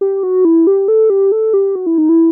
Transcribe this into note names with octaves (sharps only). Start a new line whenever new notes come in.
G4
F#4
E4
G4
A4
G4
A4
G4
F#4
E4
D#4
E4